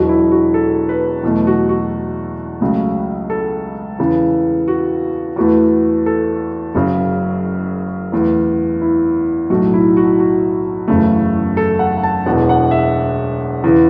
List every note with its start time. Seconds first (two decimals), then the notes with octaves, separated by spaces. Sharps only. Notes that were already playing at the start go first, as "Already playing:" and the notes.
Already playing: E1 E2 B2 F#3 F#4
0.09 E4
0.31 F#4
0.54 A4
0.89 B4
1.23 E2 B2 F#3 A3
1.47 F#4
1.69 F#4
2.61 C#2 C#3 F#3 A3
3.30 A4
3.99 E2 C#3 E3
4.68 F#4
5.36 E2 E3 A3 F#4
6.06 A4
6.75 F#1 F#2 C#3 F#4
8.12 E2 E3 A3
8.81 E4
9.50 B1 A2 F#3 A3 F#4
9.74 E4
9.97 F#4
10.20 F#4
10.88 F#1 E2 C#3 A3
11.57 A4
11.79 F#5
11.98 F#5
12.03 A5
12.26 E1 E2 B2 F#5
12.49 F#5
12.71 E5
13.64 E2 C#3 E3